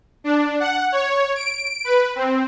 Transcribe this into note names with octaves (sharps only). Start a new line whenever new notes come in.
D4
F#5
C#5
D7
B4
C4